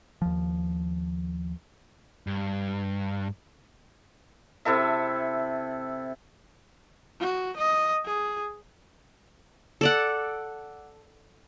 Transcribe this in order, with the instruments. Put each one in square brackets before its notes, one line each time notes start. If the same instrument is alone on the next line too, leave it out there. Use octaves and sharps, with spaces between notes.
[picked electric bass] D#2 F3
[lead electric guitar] G2
[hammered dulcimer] C3 E4 A4 E5
[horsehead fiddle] F#4
D#5
G#4
[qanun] A4 D5 F#5